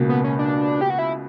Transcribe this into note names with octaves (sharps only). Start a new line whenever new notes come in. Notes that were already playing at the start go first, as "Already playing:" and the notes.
Already playing: C#2 B2 A#3
B3
C#4
D4
G4
F#4
E4